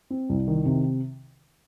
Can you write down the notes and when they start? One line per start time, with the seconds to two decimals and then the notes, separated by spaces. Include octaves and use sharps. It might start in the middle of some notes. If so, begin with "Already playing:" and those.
0.10 C4
0.29 C2
0.48 D#3
0.66 C3